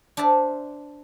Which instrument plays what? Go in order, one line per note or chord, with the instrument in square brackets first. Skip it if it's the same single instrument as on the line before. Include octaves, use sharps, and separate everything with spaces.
[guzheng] D4 C5 E5 A5